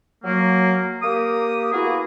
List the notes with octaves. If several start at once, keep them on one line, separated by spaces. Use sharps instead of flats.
F#3 A#3
A#3 G4 D#6
A#3 B3 E4 F#4 G#4